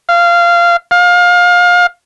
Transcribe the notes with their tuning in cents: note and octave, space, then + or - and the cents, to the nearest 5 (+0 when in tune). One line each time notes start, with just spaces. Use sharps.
F5 -20
F5 +25